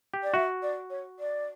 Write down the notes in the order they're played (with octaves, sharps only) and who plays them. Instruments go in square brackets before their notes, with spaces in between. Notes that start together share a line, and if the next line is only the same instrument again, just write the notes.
[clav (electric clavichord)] G4
[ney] D5
[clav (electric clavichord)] F#4 [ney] E5
[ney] D5
C#5
D5